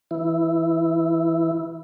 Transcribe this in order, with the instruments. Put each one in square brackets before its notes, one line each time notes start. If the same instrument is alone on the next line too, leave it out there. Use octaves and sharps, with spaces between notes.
[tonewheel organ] E3 E4